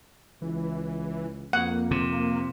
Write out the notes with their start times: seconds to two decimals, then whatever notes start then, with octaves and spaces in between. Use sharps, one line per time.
0.42 C#2 E3
1.53 F2 A#3 F#5
1.91 C3